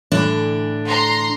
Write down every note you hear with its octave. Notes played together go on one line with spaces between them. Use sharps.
A2 D3 E3 D4
A#5 C6